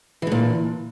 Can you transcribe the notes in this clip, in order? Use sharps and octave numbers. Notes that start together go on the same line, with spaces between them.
A#2 D3 E3